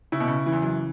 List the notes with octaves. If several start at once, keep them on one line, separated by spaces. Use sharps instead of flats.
C#3 E4
B2
C#3
E3
E2
F#2